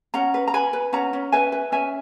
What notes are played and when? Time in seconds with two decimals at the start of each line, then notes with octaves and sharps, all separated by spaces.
0.14 C#4 F#5 A#5
0.34 B4
0.47 A#5
0.54 B4 G#5 B5
0.73 B4
0.93 C#4 F#5 A#5
1.13 C#4
1.32 B4 E5 G#5
1.52 B4
1.72 C#4 E5 G#5